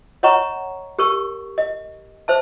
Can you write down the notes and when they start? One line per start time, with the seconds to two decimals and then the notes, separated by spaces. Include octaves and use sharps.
0.23 C#5 D#5 F#5 A#5 C#6
0.99 G4 A#4 C#6
1.58 D#5
2.28 C5 E5 A5